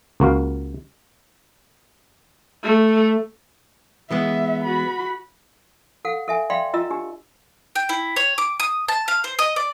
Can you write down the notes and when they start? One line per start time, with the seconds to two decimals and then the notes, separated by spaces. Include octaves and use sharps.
0.20 C#2 A#3 F#4 F5
2.63 A3
4.11 E3 G#3 B3 E5
4.64 F#4 B5
6.05 A4 F5 F#5
6.28 A4 E5 G#5
6.50 D5 E5 F5 G5 B5 C6
6.74 F4 D#5 A#5 E6
6.91 D4 G4
7.76 G5
7.89 E4
8.16 C#5
8.38 D6
8.60 D#6
8.88 A5
9.08 F5
9.24 C5
9.39 D#5
9.56 D5